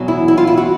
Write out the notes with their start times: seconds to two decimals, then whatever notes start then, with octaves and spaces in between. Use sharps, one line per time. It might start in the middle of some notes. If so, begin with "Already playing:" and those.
Already playing: E2 B2 F#3
0.08 E4
0.28 E4
0.38 F4
0.47 E4
0.57 F#4